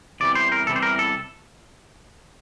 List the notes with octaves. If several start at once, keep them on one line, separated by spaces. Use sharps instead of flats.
E2 C3 E3 G3 D5
C5
A#4
E2 C3 E3 G3 A4
C5
A#4
A4